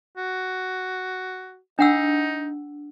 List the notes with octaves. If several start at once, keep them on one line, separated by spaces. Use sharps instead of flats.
F#4
D4 D#4 F#5 E6